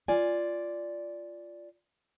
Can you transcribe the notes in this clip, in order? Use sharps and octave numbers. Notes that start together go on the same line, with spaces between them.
F4 D5 G#5